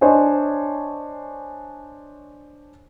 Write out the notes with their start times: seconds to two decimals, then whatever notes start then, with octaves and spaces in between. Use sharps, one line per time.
0.01 D4 C5 C#5 D#5 G#5